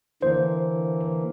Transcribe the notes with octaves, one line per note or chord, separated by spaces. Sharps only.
D3 E3 A#3 C5